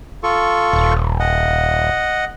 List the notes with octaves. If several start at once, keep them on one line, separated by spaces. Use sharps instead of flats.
F4 A4 C#6
D#1
D#5 F#5